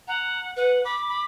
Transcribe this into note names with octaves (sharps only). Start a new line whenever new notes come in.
F#5 A#5
B4 F#5
B5 D6
B5